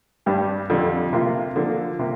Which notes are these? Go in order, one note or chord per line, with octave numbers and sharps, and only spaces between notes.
G2 G3 D4 G4
F2 D3 G3
C3 A#3 F4
D3 F3 A#3
C3 A#3